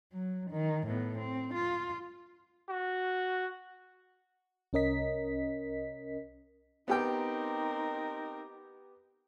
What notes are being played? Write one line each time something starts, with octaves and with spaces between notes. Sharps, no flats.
F#3
D#3
A2 B3
C4
F4
F#4
C2 C#4 A#4 D#5 B6
B3 C4 D#4 G4 A#4 G5